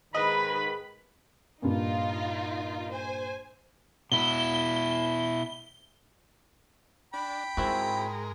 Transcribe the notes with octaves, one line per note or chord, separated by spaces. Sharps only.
G#2 D#3 G#4 B4 D#5 B5
G2 A#2 D#4 F4
C5 G#5
B2 E4 G7
D4 G5 B5
G#2 G#3 C4 E4 F#4 A#4